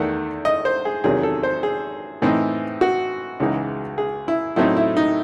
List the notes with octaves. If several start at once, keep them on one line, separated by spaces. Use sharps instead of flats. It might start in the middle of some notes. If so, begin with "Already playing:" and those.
Already playing: E2 D#3 A3 F#5
D#5
C5
G#4
E2 C3 D#3 F#3 C#4 G#4
A4
C5
G#4
A2 E3 C4 D#4
F#4
C#2 C#3 E3 G#3 D#4
G#4
E4
A2 F#3 A3 C4 D#4 E4
E4
D#4